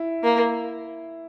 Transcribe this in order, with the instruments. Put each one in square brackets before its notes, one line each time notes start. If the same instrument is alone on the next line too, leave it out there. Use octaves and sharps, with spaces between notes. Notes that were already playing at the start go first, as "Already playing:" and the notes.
Already playing: [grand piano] E4
[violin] A#3